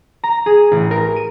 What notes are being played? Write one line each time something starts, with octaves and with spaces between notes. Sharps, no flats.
A#5
G#4
A1
A#4
D#7